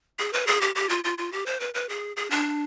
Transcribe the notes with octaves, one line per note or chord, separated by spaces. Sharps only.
G#4
B4
G#4
G4
G4
F4
F4
F4
G4
C5
B4
B4
G#4
G#4
D4